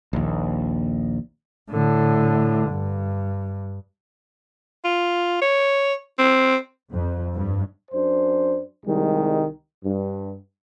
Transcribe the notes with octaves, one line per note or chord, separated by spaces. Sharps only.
A#1 D#2
A2 D3
G2
F4
C#5
C4
F2
G2
F#2 D4 C5
C2 D#3 G3 G#3
G2